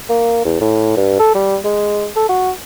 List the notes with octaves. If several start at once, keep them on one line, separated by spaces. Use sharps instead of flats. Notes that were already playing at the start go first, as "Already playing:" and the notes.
A#3
E2
A2
G2
A4
G3
G#3
A4
F#4